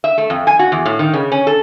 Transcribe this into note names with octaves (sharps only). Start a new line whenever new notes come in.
E5
A3
F2
G#5
F#4
E2
A2
D#3
C#3
C#4
A4